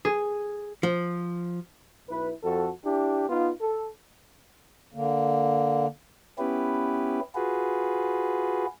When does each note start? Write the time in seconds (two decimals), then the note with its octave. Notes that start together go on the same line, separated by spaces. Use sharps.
0.05 G#4
0.83 F3
2.09 B1 E4 B4
2.44 F2 F#4 A4
2.85 D4 E4 G4
3.29 B3 D#4 F4
3.61 A4
4.94 D3 A#3
6.38 B3 C#4 E4 G4 B4
7.35 F4 F#4 G#4 B4